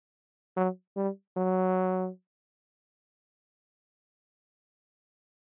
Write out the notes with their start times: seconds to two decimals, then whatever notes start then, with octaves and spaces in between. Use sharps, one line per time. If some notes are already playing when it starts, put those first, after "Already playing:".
0.57 F#3
0.97 G3
1.37 F#3